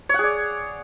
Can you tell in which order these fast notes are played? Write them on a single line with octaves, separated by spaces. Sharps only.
C#5 F#5 G#4 D5